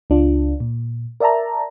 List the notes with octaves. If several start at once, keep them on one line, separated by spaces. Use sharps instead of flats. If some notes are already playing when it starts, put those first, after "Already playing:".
C#2 D4 F4
A#2
A#4 D5 E5 A5 A#5